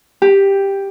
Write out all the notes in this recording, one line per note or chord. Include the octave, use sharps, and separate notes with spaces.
G4